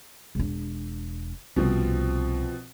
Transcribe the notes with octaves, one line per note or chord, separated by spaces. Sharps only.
E1 D4
C2 B2 F3 C4 C#4